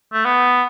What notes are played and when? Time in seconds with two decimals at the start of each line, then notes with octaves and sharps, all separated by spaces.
0.13 A3
0.25 B3